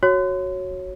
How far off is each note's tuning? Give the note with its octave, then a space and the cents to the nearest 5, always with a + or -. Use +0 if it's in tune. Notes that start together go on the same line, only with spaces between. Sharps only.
F#4 +0 C#5 -10